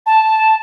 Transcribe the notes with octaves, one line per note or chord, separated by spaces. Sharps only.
A5